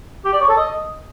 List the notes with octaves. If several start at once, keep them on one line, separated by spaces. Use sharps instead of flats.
G4
D5
C#5
A4
D#5